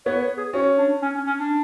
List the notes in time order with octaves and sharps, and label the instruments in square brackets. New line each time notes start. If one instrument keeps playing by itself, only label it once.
[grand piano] B3 [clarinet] C#5
[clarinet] C#5
G#4
[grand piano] C#4 [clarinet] F#4
[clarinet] D4
C#4
C#4
C#4
D4